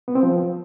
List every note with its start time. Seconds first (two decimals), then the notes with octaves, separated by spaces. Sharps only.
0.08 B3
0.15 C4
0.23 F3